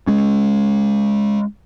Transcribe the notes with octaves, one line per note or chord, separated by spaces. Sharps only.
G#3 C#4